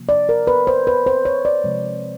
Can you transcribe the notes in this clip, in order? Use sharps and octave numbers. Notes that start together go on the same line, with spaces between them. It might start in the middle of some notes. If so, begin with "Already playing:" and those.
Already playing: C3 F3 A#3
D5
A#4
B4
C5
B4
C5
C#5
D5
C3 F3 G#3 C4